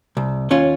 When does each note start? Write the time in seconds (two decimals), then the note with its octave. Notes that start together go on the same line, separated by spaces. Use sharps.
0.17 C2
0.51 D#2 C#4 F4